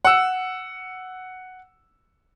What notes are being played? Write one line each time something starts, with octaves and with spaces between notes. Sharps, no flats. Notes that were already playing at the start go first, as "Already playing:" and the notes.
F#5 E6